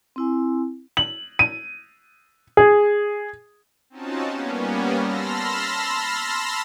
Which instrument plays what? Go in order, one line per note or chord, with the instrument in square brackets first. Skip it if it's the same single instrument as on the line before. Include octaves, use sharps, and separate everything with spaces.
[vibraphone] C4 E4 G#5
[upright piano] F#7
D#7
G#4
[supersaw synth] C4 C#4 D#4 F4 F#4 A5
G3 A#3 B3 C#4
A5 B5 C6 E6 F6 A#6